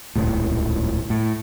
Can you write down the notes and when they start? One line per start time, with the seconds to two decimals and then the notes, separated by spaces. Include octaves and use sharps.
0.16 D#1 C#2 A2
1.10 A2